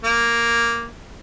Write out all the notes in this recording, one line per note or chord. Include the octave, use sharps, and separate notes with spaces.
A#3